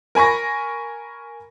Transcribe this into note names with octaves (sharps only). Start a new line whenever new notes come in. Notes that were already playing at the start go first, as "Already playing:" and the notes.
A#4 G#5 B5 C#6 A#6